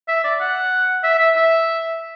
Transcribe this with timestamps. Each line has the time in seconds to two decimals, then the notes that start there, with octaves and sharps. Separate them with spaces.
0.08 E5
0.24 D5
0.41 F#5
1.04 E5
1.19 E5
1.36 E5